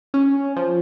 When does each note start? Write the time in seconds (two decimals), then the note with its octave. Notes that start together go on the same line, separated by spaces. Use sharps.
0.14 C#4
0.56 F3